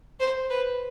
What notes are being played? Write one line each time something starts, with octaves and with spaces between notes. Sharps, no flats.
C5
B4